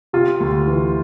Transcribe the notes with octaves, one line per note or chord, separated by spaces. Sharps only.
C3 F4
D2
E3